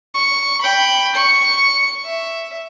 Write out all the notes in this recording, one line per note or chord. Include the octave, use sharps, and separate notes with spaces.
C#6
G5 B5
C#6 C#7
E5